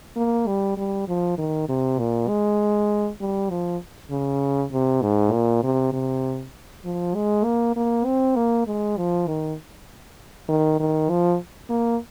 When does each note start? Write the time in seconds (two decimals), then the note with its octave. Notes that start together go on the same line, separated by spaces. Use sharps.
0.17 A#3
0.47 G3
0.77 G3
1.08 F3
1.38 D#3
1.69 C3
1.99 A#2
2.28 G#3
3.21 G3
3.50 F3
4.11 C#3
4.72 C3
5.02 G#2
5.33 A#2
5.63 C3
5.93 C3
6.85 F3
7.15 G#3
7.45 A#3
7.76 A#3
8.06 C4
8.36 A#3
8.67 G#3
8.97 F3
9.27 D#3
10.49 D#3
10.80 D#3
11.09 F3
11.70 A#3